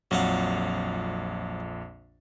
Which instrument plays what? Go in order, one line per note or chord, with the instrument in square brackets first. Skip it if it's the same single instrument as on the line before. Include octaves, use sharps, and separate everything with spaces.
[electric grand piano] A#1 F2 [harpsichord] F#3 F5 F#5